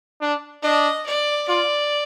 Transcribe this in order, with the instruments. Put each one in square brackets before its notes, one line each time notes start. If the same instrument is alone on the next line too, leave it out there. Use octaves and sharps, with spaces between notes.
[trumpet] D4
[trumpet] D4 [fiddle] D#5
[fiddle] D5
[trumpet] F4 [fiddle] D5